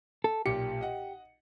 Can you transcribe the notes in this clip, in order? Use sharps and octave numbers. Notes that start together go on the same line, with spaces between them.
A4
B1 A#2 G4 C#7
D#5 F#5